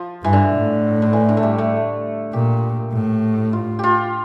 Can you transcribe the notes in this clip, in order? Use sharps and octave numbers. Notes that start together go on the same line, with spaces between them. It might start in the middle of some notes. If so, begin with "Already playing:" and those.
Already playing: F3
G2 E3
D3
A2
D3
E3
D3
A3
G3
A3
A#2 G4
A2
F4
F4 G4